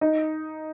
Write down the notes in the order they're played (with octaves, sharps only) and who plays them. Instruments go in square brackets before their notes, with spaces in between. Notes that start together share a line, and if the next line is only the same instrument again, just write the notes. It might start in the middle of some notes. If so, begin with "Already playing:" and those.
[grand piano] D#4 D#5